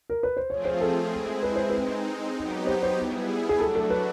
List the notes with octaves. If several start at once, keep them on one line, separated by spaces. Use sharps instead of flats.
A#4
B4
C5
F3 A3 C4 F4 G#4 C#5
C5
A4
G#3 C4 E4 G#4
B4
C5
B4
G#3 C4 D#4
F#3 B3 D#4 G4
C5
C5
G3 B3 E4 G#4
G#4
F#3 A3 D4 F#4 A4
A4
B4